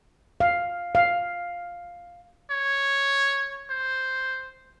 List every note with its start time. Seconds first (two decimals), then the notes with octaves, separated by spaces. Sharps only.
0.40 F5
0.95 F5
2.50 C#5
3.70 C5